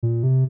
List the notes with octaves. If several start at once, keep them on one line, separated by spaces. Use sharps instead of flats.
A#2
C3